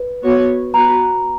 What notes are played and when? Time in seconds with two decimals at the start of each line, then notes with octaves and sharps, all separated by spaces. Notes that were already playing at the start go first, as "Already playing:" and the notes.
Already playing: B4
0.23 B3 F#4 C#5
0.74 B3 F#4 B4 A#5